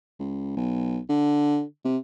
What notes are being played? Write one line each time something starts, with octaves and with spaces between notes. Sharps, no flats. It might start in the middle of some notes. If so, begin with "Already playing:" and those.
C#2
B1
D3
C3